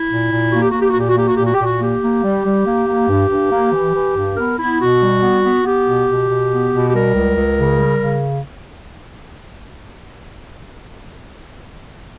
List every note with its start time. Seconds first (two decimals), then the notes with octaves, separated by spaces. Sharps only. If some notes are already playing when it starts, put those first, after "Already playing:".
Already playing: E4
0.09 A#2
0.31 A#2
0.52 A#3 F#4
0.62 G4
0.71 A#3 F#4
0.80 G4
0.89 F#4
0.95 A#2 G4
1.08 F#4
1.17 A#3 G4
1.26 F#4
1.35 A#2 G4
1.44 F#4
1.54 G4
1.60 A#2 F#4
1.80 A#3 G4
2.02 A#3
2.24 G3
2.45 G3
2.66 A#3
2.87 A#3
3.09 G2
3.30 G2
3.52 A#3
3.73 E3
3.94 E3
4.15 G2
4.37 B3 A#4
4.59 B3 E4
4.79 B2 F#4
5.01 G3
5.22 B3
5.44 B3
5.65 B3 G4
5.86 B2
6.08 B2
6.29 B2
6.51 B3
6.72 B2
6.87 G4
6.93 G3 A#4
7.15 C#2
7.36 C#2
7.57 C#3
7.78 G3
8.00 C#3